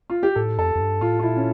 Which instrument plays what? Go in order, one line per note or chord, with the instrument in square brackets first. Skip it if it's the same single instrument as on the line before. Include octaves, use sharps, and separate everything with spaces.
[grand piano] F4
G4
[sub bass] A2 [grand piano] A4
[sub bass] F2 [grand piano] A4
[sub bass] F2
G2
[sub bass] A2 [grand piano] F4
[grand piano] F4
[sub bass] A#2 [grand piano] E4
[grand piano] C#4